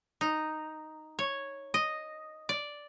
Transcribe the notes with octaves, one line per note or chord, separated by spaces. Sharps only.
D#4
C#5
D#5
D5